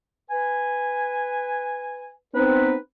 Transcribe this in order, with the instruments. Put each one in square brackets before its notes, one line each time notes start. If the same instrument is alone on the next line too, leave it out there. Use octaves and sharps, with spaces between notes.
[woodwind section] B4 G#5
[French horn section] B3 C4 [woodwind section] D#4 B4